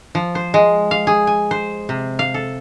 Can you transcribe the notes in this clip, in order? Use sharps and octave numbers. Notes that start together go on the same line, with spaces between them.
F3
C5
G#3
F5
G#4
G#5
C5
C3
F5
A4